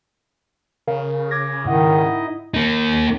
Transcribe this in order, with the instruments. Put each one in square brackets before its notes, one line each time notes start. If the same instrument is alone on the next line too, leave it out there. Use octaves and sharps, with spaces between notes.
[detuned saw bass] C#3 [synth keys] A#4 F5
[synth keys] D6 G#6 A#6
[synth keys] G#2 F#5 [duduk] D#3 [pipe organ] D#4 E4 D#5
[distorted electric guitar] A#3 D#4